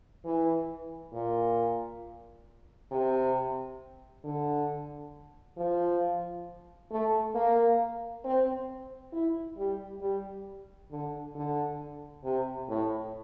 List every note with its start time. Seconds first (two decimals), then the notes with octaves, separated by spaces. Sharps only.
0.25 E3
1.13 A#2
2.91 C3
4.24 D3
5.57 F3
6.91 A3
7.35 A#3
8.25 C4
9.13 E4
9.58 G3
10.02 G3
10.91 D3
11.35 D3
12.24 C3
12.69 A2